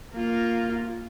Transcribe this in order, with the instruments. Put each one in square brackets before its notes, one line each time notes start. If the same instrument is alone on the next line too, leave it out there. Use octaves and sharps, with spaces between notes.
[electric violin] A#3 F4